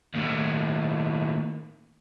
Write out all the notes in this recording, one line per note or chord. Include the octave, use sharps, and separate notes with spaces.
D#2 A2